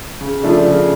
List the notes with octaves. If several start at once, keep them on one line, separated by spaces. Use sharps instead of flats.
C#3
F3 A3 D4
C#3